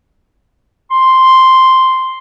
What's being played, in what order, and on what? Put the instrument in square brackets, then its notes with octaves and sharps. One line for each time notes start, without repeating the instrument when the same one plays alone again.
[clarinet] C6